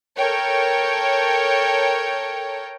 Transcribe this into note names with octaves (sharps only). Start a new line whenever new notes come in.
A4 A#4 C#5 G5